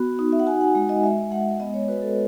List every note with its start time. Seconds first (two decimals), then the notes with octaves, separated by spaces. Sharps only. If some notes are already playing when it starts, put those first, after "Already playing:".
Already playing: B3 F#4
0.19 D#4
0.32 E5
0.40 F#5
0.47 F#4 G#5
0.61 F#5
0.75 G#3
0.89 D#5
1.03 G#3 E5
1.32 G#3 F#5
1.60 B3 D#5
1.74 C#5
1.88 F#4 B4
2.02 A4